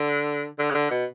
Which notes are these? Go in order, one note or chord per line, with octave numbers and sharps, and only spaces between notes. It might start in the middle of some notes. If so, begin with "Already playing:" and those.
Already playing: D3
D3
C#3
D3
B2